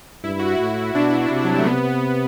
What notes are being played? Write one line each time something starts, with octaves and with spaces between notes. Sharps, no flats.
G2 E4
F#4
E4
A2
F#4
B2 D4
C3
F#3
G3
A3
C3 B3
B3